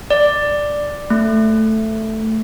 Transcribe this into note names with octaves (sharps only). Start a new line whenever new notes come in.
D5
A3